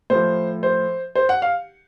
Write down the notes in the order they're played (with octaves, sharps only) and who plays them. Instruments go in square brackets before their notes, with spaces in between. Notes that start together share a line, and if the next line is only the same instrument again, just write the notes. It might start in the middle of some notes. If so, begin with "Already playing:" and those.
[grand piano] A2 F3 C5
C5
C5
F#5
F5